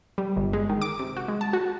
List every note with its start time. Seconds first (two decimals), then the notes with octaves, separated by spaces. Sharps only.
0.18 G3
0.37 G1
0.53 G#3
0.69 D#3
0.81 D6
0.99 C3
1.17 F#4
1.28 G#3
1.41 A5
1.53 F#4